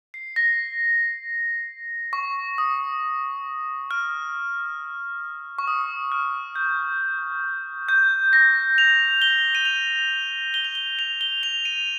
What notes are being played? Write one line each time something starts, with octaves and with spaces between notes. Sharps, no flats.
C7
A#6
C#6
D#6
F6
C#6
D#6
F6
G6
G6
A#6
F7
G7
D#7
F7
G7
F7
G7
F7
G7
F7
D#7